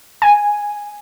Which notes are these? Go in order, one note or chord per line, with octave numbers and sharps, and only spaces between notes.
G#5